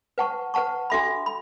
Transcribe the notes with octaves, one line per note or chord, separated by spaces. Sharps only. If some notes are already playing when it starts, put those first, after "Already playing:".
B4 F#5 A5 C#6
B4 F#5 A5 C#6
D4 F#4 A4 E5 B5
B5